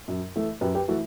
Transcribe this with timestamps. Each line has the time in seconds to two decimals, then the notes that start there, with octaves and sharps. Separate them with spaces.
0.08 F#2
0.36 E3 A3
0.61 F#2 G4 B4
0.75 G4 B4
0.88 E3 A3 F#4 A4